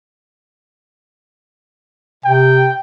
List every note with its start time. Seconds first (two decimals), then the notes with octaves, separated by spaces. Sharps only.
2.25 C3 G5